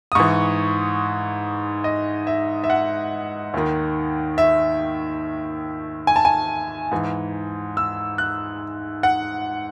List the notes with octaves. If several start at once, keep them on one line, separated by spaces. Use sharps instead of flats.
D#6
G#2 E3 C#6
D#5
E5
E5
F#5
D#2 D#3
E5
G#5
A5
G#5
G#2 E3
E6
F#6
F#5